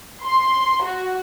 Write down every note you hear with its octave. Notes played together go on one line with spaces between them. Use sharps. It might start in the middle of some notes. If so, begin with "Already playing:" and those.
C6
F#4